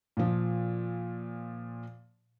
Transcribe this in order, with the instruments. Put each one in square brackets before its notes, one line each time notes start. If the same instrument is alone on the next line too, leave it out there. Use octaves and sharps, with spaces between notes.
[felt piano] A#2 F3